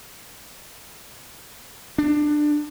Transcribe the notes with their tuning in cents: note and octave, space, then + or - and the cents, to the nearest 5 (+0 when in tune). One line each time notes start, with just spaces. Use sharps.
D4 +20